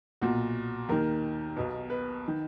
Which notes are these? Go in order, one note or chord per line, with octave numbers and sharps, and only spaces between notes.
B1 A#2 F#4
D#2 D#3 A#4
B1 B2
B4
D#3